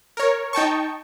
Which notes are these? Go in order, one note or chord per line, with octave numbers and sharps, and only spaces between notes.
A#4 C#5
D#4 G5 A5 C#6